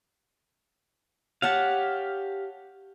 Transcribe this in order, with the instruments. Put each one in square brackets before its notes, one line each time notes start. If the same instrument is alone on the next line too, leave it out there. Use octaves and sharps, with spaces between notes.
[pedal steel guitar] G4 F5 [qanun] C#5 F#5 A5